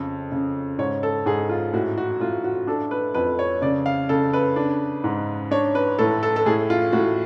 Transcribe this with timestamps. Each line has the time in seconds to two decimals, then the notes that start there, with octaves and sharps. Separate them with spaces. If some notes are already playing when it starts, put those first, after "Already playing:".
Already playing: F2 C#3
0.32 C#3
0.78 G#2 C#5
1.03 A4
1.26 G#2 G#4
1.49 F4
1.73 A2 F#4
1.98 F#4
2.20 A2 F4
2.44 F#4
2.67 D4 A4
2.91 B4
3.14 F2 B4
3.39 C#5
3.62 C#3 D5
3.86 F5
4.09 C#3 A4
4.33 B4
4.56 D4
5.04 G#2
5.51 D4 C#5
5.75 B4
5.99 A2 A4
6.23 A4
6.36 A4
6.46 A2 G#4
6.70 F4
6.92 A2 F#4